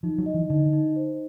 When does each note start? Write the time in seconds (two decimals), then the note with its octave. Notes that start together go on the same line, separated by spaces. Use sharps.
0.03 F3 D#4
0.18 F#3
0.26 D#5
0.34 E3
0.50 D3 D#4
0.73 D#4
0.96 C5